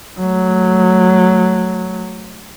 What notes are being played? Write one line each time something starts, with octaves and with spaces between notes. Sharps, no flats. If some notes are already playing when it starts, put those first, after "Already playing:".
F#3 A3